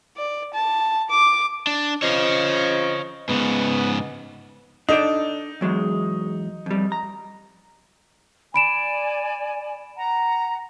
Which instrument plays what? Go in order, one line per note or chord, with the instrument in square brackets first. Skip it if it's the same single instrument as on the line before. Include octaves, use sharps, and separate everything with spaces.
[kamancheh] D5
A5
D6
[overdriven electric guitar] D4
[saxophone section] C#3 F3 D#5 [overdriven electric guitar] C#5 F5
[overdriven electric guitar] G#2 C#3 [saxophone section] B3
[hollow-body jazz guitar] D4 A4 D5 [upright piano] D#4
[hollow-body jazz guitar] E2 F#3 G#3
F2 G3
A#5
[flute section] D5 G#5 [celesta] B5 D7 E7
[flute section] F#5 A#5